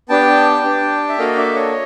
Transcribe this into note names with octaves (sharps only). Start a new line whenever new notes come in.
B3 D4 G4 G5 A5
D4 G4
E5
A#3 D4 F#4 A4 D#5 F5
D5 E5
C#5 D#5